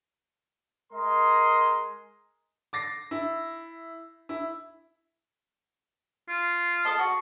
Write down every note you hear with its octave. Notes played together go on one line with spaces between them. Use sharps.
G#3 A#4 D#5 C6
D6 A6 A#6 C7
E4
E4
F4
A4 D#5 A5
F#4